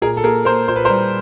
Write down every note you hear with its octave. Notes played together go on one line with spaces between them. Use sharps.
A#2 G#4 A#4
A4
A#3 G#4 A#4
A#3 A#4 C5
A#2 C5
B4
G3 A#4 C5